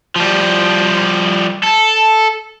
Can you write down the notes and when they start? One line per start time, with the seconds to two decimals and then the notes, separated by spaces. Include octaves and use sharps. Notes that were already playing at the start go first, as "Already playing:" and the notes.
0.16 F3 G3
1.63 A4